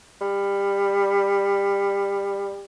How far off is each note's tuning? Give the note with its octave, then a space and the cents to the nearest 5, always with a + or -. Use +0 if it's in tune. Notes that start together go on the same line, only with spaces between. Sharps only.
G3 +20